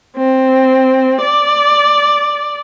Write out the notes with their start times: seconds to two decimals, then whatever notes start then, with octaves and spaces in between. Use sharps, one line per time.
0.17 C4
1.21 D5